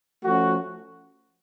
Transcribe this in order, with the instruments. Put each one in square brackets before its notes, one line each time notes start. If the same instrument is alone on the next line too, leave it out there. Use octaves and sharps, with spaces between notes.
[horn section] F3 A3 C#4 F#4